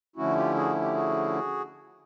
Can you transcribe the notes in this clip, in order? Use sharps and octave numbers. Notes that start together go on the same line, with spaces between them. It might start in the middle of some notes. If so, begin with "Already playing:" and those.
D3 F3 A3 C#4 E4 F#4
F4 G4
F#4 G#4
G4
F#4 G#4